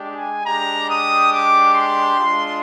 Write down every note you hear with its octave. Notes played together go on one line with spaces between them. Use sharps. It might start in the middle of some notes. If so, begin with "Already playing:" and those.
Already playing: G#3 D4 G4
G#5
G#3 D4 G4 A#5
D#6
D6
C6
G#3 D4 F4